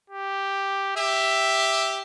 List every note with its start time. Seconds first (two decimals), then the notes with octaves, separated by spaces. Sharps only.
0.10 G4
0.97 G4 E5